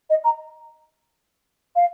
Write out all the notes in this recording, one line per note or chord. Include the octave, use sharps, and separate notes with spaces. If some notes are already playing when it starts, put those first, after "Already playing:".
D#5
A#5
F5